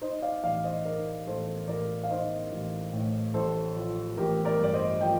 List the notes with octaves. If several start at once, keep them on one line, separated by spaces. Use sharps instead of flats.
D#4 C5 D#5
D5 F5
A1 D5 F5
C5 D#5
D#4 A#4 D5
A1 A4 C5
A1 A#4 D5
F5
D#4 C5 D#5
A1
A2
A1 A4 C5
F3
A1 G4 A#4
A#4 D5
G2 D5
C5 D#5
F3 D#5 G5